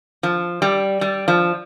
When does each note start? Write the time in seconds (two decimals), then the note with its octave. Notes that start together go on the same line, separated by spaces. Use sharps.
0.23 F3
0.62 G3
1.01 G3
1.28 F3